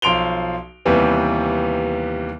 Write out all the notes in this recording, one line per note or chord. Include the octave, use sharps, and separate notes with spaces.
B1 F3 C6 D7 F7 G7
D#2 C3 E3 G3 B3